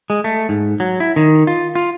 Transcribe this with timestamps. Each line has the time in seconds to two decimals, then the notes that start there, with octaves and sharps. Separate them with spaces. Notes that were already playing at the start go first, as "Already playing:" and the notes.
0.10 G#3
0.24 A3
0.49 G#2
0.80 F#3
1.00 E4
1.16 D#3
1.47 F4
1.75 F4